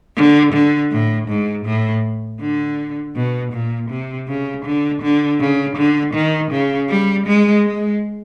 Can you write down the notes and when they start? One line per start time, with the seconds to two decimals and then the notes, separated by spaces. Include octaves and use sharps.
0.16 D3
0.53 D3
0.91 A2
1.29 G#2
1.65 A2
2.41 D3
3.16 B2
3.53 A#2
3.90 C3
4.28 C#3
4.65 D3
5.02 D3
5.40 C#3
5.76 D3
6.14 D#3
6.51 C#3
6.89 G3
7.26 G#3
7.64 G#3